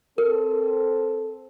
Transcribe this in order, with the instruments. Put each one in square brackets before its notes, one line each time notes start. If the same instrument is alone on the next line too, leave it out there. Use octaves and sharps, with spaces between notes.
[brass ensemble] C4 A4 [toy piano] A#4